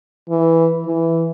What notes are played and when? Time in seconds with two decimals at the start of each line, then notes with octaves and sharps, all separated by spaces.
0.30 E3
0.86 E3